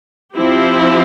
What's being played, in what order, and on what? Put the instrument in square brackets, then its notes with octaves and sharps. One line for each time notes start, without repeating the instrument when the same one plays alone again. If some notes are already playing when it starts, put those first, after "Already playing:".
[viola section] F3 C4 E4 G4